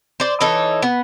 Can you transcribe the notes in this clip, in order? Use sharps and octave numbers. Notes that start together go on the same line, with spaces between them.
C5 D5
E3 D#4 A4 C#5
B3